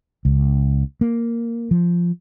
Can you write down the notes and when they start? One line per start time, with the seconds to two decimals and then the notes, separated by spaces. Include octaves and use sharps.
0.25 C#2
1.01 A#3
1.71 F3